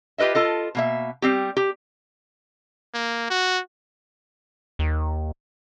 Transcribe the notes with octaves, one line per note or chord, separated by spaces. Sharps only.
F4 G4 B4 D#5 E5
F4 A4 D#5
B2 A#3 E5
G3 C4 G4
G4
A#3
F#4
D#2